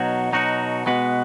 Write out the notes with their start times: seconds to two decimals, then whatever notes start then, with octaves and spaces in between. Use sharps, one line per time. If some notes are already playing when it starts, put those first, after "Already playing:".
Already playing: B2 F#3 D#4 F#4
0.33 B2 F#3 D#4 F#4
0.86 B2 G#3 B3 F#4 B4